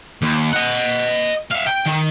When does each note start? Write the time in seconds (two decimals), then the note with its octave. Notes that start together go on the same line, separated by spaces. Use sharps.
0.22 D#2
0.53 D#5 F#5
1.51 E5 F5
1.66 G5
1.86 D#3